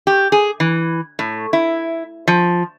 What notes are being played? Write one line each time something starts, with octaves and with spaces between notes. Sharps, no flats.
G4
G#4
E3
A2
E4
F3